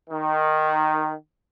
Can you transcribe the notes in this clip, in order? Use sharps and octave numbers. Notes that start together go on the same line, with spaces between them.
D#3